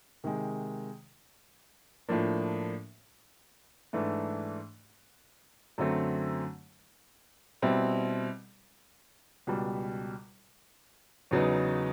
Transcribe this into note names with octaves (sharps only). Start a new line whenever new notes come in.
C3 D#3 G#3
A2 F3 A#3 D4
G#2 E3 A3 D4
F#2 D3 F#3 A3 C4
B2 G3 C4 E4
C#2 B2 G3
E2 C#3 F#3 B3 D#4